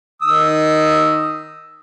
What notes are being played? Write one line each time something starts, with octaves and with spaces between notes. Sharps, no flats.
D#3 D#6 E6